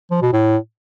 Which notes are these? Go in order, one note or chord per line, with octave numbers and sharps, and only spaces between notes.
F3
B2
A2